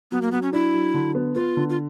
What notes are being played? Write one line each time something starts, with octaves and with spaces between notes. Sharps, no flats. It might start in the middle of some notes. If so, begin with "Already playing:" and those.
F#3 B3
A#3
F#3 B3
C#4
D4 E4
F#3
D3
B3
B3 F4
D3
F4